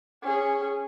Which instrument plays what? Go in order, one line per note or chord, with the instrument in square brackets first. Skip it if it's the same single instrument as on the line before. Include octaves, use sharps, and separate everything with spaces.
[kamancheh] C#4 G#4